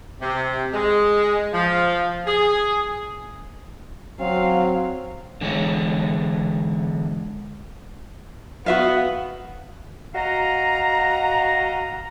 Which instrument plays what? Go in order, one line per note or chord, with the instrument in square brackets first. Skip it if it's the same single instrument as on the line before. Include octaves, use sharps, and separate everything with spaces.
[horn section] C3
G#3
F3
G#4
[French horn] F#3 [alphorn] C4 [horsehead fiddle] F5
[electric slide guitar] D3 E3 G#3 C#5
[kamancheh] B3 [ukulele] F#4 E5 F5
[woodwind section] F#4 D#5 F5 A#5